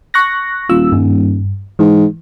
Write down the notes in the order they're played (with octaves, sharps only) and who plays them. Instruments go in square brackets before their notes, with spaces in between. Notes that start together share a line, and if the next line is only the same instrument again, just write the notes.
[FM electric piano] C#6 F#6 A#6
[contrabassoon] D#1 [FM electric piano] F4 E6
[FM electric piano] G2
[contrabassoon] G#2 [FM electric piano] E3